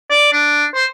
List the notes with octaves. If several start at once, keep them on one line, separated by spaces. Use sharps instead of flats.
D5
D4
C5